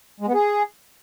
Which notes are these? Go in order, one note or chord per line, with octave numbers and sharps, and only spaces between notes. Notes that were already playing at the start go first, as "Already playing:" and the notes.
G#3
B3
G#4